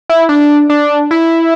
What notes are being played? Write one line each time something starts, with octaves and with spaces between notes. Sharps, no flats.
E4
D4
D4
E4